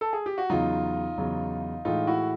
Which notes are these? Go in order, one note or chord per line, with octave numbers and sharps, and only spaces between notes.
A4
G#4
G4
F#4
E2 C#3 F#3 D#4 F4
E2 C#3 F#3
A2 E3 G#3 D#4 F4
E4 F#4